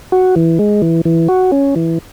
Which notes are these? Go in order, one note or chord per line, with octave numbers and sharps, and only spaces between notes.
F#4
E3
G#3
E3
E3
F#4
C#4
E3